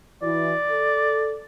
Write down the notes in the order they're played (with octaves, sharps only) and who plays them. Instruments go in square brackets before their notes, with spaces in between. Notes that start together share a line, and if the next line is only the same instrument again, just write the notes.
[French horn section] E3 E4 F#4 [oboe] D5
[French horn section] A4